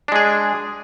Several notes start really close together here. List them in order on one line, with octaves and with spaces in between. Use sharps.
D4 G#3 G#4